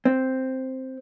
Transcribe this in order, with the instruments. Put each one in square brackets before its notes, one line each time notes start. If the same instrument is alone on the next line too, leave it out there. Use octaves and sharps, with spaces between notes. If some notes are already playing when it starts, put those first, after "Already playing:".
[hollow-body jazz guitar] C4